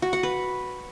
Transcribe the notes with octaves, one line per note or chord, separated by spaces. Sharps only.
F#4
F#5
B4